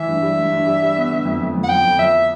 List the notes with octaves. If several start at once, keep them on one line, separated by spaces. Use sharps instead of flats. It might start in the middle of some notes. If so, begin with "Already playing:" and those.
Already playing: E3 E5
G2
G3
G2
G2
G3
G3
B3
D3
F2
F2
F2
F#5
F3 G5
F2
F3 E5